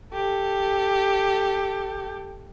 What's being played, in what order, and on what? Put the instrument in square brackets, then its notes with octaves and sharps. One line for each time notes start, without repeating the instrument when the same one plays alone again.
[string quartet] G4 A4